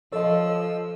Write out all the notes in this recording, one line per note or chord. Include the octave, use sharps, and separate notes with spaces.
F3 A4 C#5 D#5 E6